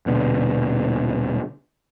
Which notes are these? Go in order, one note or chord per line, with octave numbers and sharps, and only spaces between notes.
D#1 B2 D3